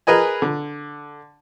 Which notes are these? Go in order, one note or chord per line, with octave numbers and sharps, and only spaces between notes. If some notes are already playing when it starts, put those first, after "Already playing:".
G#4 A#4 B4 D#5 G#5
D3